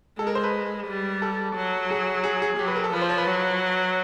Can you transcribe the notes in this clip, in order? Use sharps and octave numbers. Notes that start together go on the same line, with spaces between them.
G#3 A4
A#4
C5
B4
G3
A4
F#3
G#4
G#4
G#4
F#3 G4
B4
A#4
A4
F3 B4
C5
C#5
B4
F#3